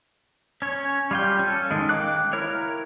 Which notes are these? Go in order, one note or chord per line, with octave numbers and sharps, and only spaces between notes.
C#4 C#5
G3 F4 G5
C#4 A4
D#3 G#3
F5 G5 D6 F#6
E4 A#4 C#5